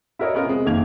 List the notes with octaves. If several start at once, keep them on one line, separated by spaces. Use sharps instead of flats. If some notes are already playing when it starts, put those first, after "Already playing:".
E4 F#4 A#4 C#5 D#5
B3 C#4 F4 A#4
C3 G#3
F#1 D#3 A#3 G#6 F7